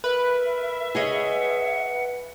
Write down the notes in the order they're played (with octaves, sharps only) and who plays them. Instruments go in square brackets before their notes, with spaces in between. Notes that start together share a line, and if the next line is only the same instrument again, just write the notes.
[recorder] A#4 [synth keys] B4 [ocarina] E5
[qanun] G#4 C#5 D#5 [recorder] F#5